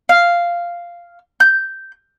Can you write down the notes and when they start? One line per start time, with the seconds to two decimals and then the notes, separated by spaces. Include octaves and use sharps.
0.09 F5
1.40 G6